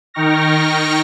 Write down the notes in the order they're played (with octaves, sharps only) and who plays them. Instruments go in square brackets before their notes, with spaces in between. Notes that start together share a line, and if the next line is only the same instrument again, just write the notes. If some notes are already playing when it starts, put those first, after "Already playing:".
[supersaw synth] D#3 D#4 G5 C#6 F6 A#6